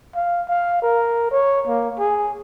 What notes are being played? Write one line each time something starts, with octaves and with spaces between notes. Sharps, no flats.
F5
F5
A#4
C#5
A#3
G#4